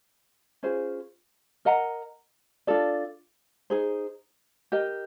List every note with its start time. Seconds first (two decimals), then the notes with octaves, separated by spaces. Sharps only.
0.63 C#4 F4 G#4 C5
1.65 A#4 D#5 F#5 A#5
2.67 D4 F4 A4 D5
3.70 D#4 G#4 C5
4.72 G4 A#4 D#5 G5